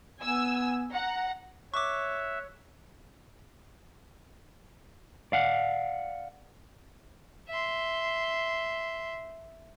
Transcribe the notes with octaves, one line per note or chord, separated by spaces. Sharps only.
B3 G#5 E6
F#5 A#5
C#5 E5 C#6 D6 F#6
D5 F5 F#5
E5 C6